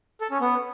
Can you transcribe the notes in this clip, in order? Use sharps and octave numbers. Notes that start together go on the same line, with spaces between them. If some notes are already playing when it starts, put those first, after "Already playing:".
A4
C#4
B3